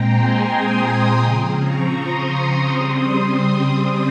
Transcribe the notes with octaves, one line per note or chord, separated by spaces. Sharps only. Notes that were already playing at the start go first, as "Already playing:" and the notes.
Already playing: A#2 G#3 C4 G5 A#5
G#5 C6
C6 D#6
C#3 F3 C4
A#5 C#6
C6 D#6
A#5 C#6
C#3 G3 C4 C6 D#6